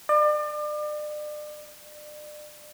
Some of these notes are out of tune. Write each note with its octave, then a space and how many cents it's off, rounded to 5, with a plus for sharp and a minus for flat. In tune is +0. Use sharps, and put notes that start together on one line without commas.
D5 +35